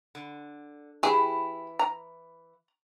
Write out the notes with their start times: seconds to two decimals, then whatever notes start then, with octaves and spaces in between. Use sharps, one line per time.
0.15 D3
1.03 E3 E4 G4 G#4
1.79 A#5